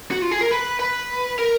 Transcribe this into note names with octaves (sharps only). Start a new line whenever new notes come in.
F#4
F4
G#4
A#4
B4
B4
A#4